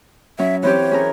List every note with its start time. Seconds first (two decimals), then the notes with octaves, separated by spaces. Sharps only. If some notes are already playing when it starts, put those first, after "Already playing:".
0.39 F#3 C#4 E5
0.63 E3 C4 G4 C#5
0.91 C#4 G#4 A#4